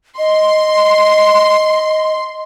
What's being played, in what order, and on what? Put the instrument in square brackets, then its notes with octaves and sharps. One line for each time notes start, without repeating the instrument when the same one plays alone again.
[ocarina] D#5 [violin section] C6